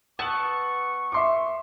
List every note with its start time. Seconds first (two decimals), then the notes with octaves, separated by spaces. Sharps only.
0.19 B3 A5 C#6 E6 F#7
1.12 E5 C6 D6